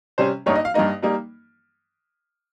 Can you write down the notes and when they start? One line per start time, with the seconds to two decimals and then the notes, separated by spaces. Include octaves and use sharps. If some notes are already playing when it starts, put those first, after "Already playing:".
0.18 C3 G3 C#4 C5
0.46 G2 G3 A#3 D#4 C#5
0.56 D#5
0.65 F5
0.74 G2 G3 A#3 D#4 D#5
1.02 G3 A#3 D#4